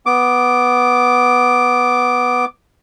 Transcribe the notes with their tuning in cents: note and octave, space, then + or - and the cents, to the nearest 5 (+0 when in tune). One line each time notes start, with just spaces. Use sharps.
B3 +0 D6 +0